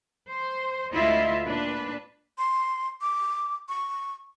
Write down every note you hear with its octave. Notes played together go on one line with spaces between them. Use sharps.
C5
D2 G#3 E4 F4 D#5 E5
A#2 D4 B4
C6
D6
C#6